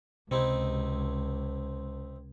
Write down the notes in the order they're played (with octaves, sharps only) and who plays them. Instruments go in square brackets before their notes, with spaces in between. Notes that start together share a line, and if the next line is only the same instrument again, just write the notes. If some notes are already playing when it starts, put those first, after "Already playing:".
[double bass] C#2 [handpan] C3 [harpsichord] C4 D#4 E4